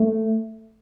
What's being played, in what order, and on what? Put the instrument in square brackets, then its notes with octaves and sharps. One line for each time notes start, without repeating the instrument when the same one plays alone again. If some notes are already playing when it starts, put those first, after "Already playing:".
Already playing: [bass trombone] A3